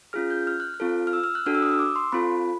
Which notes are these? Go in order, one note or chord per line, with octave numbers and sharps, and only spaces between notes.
C#4 F4 G#4 F6
G6
F6
F#6
F6
C4 F4 A4
F6
E6
F6
F#6
D4 F#4 A4 F6
E6
D#6
E6
D6
C6
C4 F4 A4 B5